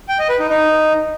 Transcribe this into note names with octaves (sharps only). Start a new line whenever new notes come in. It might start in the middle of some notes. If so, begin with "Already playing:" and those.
G5
D#5
B4
D#4
D#4